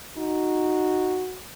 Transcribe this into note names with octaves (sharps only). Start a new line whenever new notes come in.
D#4 F#4